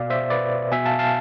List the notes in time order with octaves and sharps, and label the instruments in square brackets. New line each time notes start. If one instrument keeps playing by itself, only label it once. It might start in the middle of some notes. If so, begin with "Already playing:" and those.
Already playing: [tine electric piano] B2 D5 F5
C5 E5
B4 D5
B2 E5 G#5
F5 A5
F5 A5